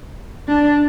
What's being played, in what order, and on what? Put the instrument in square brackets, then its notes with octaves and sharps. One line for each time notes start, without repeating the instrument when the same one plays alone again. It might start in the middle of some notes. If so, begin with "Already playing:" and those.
[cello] D4